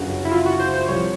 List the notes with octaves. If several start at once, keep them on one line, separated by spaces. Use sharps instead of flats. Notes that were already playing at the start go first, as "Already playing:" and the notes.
Already playing: G1 F#2 C#3 F#4
E4
F4
F#4
C5
C5
C2 C3 F3 C#5